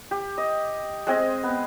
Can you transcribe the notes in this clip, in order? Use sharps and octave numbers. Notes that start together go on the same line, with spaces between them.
G4
D#5
G#3 C4 G#4 D#5
B3